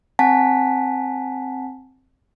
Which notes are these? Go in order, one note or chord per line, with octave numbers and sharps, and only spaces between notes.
C4 F#5 G#5 A5 B6